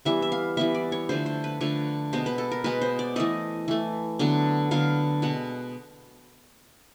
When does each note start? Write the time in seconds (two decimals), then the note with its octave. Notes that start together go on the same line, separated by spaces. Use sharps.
0.05 E3 G3 B3 E5
0.22 E5
0.32 F5
0.57 E3 G3 B3 E5
0.75 D5
0.92 C#5
1.09 D3 F3 A3 C5
1.26 C5
1.44 B4
1.61 D3 F3 A3 C#5
2.13 B2 G#3 B3 C5
2.26 B4
2.38 A4
2.52 A#4
2.64 B2 G#3 B3 B4
2.81 C5
2.99 D5
3.16 E3 A3 D#5
3.68 E3 A3
4.19 D3 F#3 B3
4.71 D3 F#3 B3 F5
5.22 B2 G#3 F#5